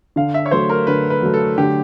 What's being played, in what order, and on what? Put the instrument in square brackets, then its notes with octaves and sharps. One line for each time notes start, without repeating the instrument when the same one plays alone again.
[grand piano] D3 [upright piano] F5
[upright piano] E5
C#5
[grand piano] F#3 A3 [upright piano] C5
[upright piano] A#4
[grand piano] D3 [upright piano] B4
[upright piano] B4
[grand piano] F#3 A3
[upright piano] A4
[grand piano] D3 [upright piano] G4